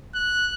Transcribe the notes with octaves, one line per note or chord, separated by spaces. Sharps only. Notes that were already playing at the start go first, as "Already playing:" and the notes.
F#6